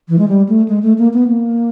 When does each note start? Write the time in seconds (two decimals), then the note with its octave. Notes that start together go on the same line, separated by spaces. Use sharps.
0.09 E3
0.18 G#3
0.28 G3
0.49 A3
0.68 G#3
0.83 A3
0.98 A#3
1.14 B3
1.28 A#3